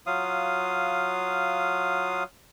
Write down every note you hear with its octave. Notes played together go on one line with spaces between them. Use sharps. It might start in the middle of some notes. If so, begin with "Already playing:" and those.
F#3 F4 F5 D#6